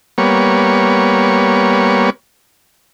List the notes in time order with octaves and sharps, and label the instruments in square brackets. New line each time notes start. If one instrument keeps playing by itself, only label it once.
[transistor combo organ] G3 A#3 B3 C#5